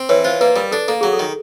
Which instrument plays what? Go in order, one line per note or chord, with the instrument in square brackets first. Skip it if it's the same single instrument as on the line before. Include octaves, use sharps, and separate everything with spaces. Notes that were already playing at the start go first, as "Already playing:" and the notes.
Already playing: [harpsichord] C4
[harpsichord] E3 [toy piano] B4 C#5
[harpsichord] F4 [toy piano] C5
[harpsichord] A#3 [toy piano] B4
[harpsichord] G3 [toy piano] A#4
[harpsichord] D4 [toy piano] A4
[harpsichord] A#3 [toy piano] A4
[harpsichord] F#3 [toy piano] G#4
[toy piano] A4
[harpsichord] D#3